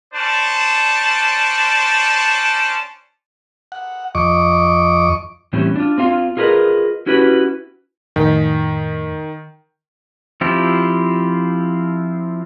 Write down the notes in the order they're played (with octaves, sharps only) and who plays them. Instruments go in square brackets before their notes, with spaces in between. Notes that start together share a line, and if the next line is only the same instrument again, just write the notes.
[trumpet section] C#4 D4 C5 D5 A5
[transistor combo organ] F#5
F2 D#5 C#6 D6
[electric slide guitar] A2 E3 G3 C4 C#4
D4 F4
C4 F4 F5
F4 G#4 A#4 B4 D#5
C#4 E4 F#4 G4 B4
[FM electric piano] F2 A2 B6 [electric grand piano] D#3
[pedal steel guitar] F3 C4 E4 F4 G4